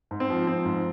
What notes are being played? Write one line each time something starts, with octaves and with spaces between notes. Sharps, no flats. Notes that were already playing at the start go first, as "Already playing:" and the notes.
G#2
C4
F3
F3 C4
G#2